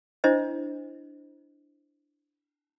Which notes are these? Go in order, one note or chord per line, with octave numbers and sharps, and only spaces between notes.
D4 E4 C5 D#5